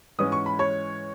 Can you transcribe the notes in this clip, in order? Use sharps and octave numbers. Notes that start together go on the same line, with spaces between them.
G#2 E3 G#3 C#4 D#6
C#6
B5
C#5 C#6